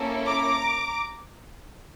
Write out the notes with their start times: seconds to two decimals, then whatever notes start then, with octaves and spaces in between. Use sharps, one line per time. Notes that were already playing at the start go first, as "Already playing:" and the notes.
Already playing: A#3 C#4 E4 A4
0.24 A#5 D6